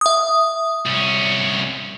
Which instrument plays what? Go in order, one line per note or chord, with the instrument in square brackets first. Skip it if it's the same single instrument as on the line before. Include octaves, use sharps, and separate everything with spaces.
[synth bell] E5 D#6
[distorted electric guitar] C2 C#4